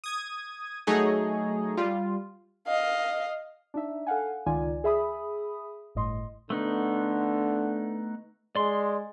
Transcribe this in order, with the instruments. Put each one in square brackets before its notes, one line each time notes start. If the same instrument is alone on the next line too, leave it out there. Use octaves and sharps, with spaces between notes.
[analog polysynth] D#6 G#6 D#7
F#3 A3 D#4 G#4 C#5 D#5
G3 F4
[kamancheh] D#5 F5
[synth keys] D4 D#4 E5
A4 F5 F#5 G#5
C#2 D#3 D#4 F4 D5 G#5
G#4 E5 B5 D#6
G1 A2 D#5 C6
[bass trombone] D3 [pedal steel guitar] A3 B3 D#4
[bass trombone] G#3 [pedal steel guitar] D5 C6